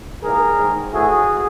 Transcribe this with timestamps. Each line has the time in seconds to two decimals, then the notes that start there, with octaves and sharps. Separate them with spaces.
0.23 G#2 E3 G3 A#3 G#4 A#4
0.58 G#2 D#3 G#3
0.93 A2 E3 A3 F#4 G#4